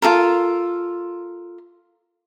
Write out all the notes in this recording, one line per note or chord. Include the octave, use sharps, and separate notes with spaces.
F4 F#4 A4 A#4